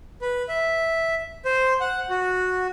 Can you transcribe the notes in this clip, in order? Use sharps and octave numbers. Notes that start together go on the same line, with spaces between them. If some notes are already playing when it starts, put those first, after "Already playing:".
B4
E5
C5
F#5
F#4